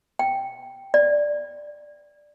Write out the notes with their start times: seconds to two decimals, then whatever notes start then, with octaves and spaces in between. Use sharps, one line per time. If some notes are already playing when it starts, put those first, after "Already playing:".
0.19 G5
0.94 D5